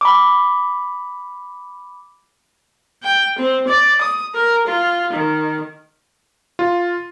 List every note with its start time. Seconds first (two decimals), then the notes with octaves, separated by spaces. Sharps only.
0.01 B5 D6
3.03 G5
3.38 C4
3.67 D5
4.01 D#6
4.34 A#4
4.66 F4
5.12 D#3
6.59 F4